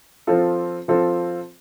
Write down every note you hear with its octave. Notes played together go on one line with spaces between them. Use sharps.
F3 C4 F4 A4
F3 C4 F4 A4